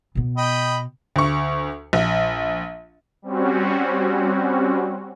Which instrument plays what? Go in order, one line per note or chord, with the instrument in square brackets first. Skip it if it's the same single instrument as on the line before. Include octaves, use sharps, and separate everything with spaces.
[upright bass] B2 B3
[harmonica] D#5 G5 B5
[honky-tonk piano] D2 C#6
A#1
[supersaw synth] G3 C4 C#4 F#4